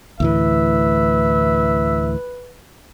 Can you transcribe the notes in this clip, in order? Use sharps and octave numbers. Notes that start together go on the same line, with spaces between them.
D2 A2 E3 B4 E5